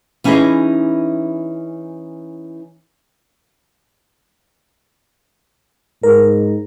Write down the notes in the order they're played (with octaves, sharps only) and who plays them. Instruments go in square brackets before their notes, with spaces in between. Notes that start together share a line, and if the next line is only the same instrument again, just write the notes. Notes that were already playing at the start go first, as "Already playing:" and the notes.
[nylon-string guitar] E3 C#4 D#4 E4 G#4 D#5
[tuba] G#2 [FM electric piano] A#4